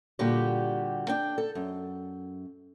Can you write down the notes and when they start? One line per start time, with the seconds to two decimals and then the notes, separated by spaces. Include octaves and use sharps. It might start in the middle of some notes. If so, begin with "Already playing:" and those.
0.19 A#2 D3 G3 F#4 G4
1.08 D4 G5
1.38 A4
1.55 F#2